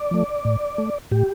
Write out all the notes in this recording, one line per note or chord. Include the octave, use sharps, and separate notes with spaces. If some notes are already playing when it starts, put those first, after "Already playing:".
Already playing: D5
F3 A3
A2
A3
A2 G4